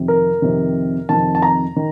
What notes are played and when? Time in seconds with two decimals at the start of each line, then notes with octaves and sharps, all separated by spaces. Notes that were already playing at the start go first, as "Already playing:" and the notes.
Already playing: F2 C3 D#3
0.08 A#4
0.42 F2 C3 D#3
1.09 F2 C3 D#3 A5
1.35 A5
1.42 A#5
1.76 D#3